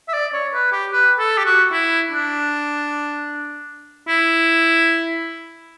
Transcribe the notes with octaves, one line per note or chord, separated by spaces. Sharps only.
E5
D5
C#5
B4
G4
B4
A4
G4
F#4
E4
D4
E4